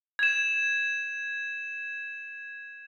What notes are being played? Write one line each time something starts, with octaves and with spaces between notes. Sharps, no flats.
G#6 E7